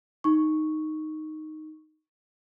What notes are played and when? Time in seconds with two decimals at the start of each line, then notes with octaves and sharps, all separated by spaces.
0.24 D#4 C#6